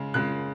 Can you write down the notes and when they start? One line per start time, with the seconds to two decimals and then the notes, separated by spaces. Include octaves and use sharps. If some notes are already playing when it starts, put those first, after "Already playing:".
Already playing: C#3 G#3
0.14 C#3 G#3 F#6